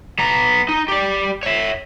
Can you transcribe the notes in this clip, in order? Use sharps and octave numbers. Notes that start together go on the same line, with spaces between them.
B3 A#5
D#4
G4 D5
C#5 E5